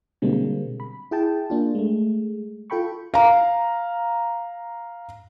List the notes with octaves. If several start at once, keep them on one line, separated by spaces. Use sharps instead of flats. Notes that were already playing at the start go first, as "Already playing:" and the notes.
B2 D3 G3 G#3 A#3 C4
B5
E4 G#4 G5 A5
A#3 D4 F4
G#3 A3
F4 A4 G5 B5 C#6
F5 A#5